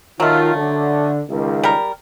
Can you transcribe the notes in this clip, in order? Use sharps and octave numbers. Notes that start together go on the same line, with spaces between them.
D#3 F#3 A3 F4
D3
C#2 D#3
G3 A#4